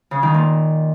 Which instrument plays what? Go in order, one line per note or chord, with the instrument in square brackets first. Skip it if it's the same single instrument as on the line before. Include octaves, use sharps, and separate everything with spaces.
[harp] C#3
D#3
A#2